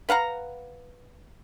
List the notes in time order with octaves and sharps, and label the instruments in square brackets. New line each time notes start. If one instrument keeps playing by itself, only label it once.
[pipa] B4 F5 F#5 A#5